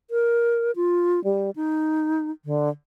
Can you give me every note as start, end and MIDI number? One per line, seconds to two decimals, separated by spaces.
0.11 0.71 70
0.76 1.23 65
1.24 1.51 55
1.56 2.31 63
2.45 2.69 50